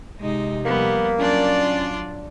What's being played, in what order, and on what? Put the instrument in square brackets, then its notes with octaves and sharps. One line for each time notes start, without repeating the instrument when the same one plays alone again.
[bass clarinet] C3 [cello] G#3 D#4
[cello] F3 G3 [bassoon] A#3 [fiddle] B3
[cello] F#3 F4 [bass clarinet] C#4 [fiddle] D4 D5